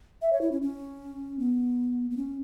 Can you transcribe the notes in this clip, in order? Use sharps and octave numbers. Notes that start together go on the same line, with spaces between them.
E5
C#5
E4
C#4
C#4
B3
B3
C#4